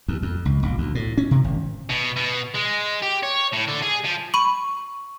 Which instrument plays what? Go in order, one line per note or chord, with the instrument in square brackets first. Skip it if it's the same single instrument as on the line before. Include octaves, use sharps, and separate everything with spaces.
[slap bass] D#2
F2
C#2
A#1
D2
A2
C#4
C3
G#1
[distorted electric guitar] B2
B2
G#3
G4
C#5
A2
D3
G#4
F3
[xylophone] B5 D#7 [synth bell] C#6